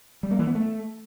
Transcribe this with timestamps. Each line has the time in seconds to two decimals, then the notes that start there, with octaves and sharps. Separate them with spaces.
0.23 G3
0.31 A#3
0.39 E3
0.47 B3
0.55 A3